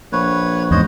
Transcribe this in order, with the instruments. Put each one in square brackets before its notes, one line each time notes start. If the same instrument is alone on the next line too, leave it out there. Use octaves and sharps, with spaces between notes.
[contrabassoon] A#1 [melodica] B4 C#5
[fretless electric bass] E2 G#2 [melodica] C5 C#5 D#5